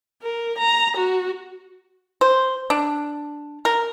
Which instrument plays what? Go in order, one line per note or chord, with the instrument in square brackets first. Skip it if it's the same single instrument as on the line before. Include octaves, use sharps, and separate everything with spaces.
[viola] A#4
A#5
F#4
[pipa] C5
D4
A#4